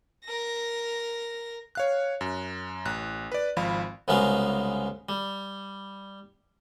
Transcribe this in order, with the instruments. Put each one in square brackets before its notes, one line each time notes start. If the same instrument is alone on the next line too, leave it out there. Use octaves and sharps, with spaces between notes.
[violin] A#4 A#6
[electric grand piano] C#5 F5 F#6
F#2
A1 F#6
B4 D5
G#1 F3 F5 B5
[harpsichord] C2 C#3 F#3 G#3 B3 F5
G3